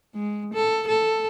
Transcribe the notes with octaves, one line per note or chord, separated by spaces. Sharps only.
G#3
A4
A4